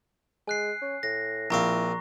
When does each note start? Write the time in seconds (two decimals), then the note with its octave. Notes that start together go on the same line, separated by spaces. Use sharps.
0.48 G#3 G#5 F#6 C7
0.82 C#4
1.03 A2 A#6
1.50 A#1 C4 E4 F5 A#5 C#6